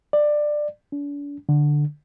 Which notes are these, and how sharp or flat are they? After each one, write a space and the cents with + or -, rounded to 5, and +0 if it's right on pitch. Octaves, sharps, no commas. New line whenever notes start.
D5 +15
D4 -40
D3 +5